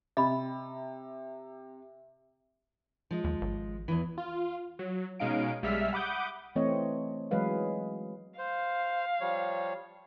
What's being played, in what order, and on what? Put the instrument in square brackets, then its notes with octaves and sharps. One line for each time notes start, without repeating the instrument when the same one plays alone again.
[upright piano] C3 [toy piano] D#5 B5 [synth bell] E5
[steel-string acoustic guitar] F3 G#3
[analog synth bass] D#2
G#1
[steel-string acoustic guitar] E2 E3
[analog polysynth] F4
F#3
B2 G#3 C#4 D#4 F5 D7
B1 G3 G#3 E5 F6 B6
F#5 B5 D6 D#6 G6
[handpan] E3 A3 C4 C#5 D#5
E3 F#3 G#3 G#4 B4 F5
[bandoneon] C5 [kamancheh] F5
[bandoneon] F3 G3 C#5